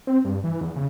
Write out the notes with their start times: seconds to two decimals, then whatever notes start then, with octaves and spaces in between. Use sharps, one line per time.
0.07 C4
0.25 G2
0.44 E3
0.61 E2
0.76 C#3